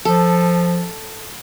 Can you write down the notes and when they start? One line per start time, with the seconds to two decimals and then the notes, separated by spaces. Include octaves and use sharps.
0.05 F3 A4